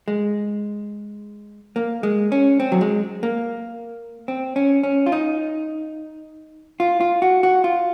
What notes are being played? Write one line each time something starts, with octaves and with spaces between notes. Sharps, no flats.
G#3
A#3
G#3
C#4
C4
F#3
G#3
A#3
C4
C#4
C#4
F4
D#4
F4
F4
F#4
F#4
F4